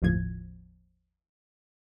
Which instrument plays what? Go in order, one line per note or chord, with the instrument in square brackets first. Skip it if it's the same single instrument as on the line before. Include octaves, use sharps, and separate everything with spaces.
[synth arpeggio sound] G1 D#2 A2 F3 G#6